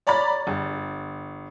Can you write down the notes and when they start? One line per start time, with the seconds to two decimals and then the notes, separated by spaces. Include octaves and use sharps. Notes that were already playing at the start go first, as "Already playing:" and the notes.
0.07 C#5 D5 A#5 B5 A6
0.47 G1